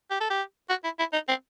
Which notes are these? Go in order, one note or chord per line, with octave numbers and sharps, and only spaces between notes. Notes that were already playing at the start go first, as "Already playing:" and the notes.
G4
A4
G4
F#4
E4
E4
D#4
C4